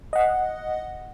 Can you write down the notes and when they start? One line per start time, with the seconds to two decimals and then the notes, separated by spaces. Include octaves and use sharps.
0.13 D#5 F#5